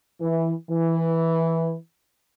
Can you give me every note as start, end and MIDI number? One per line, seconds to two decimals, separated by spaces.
0.21 0.52 52
0.70 1.74 52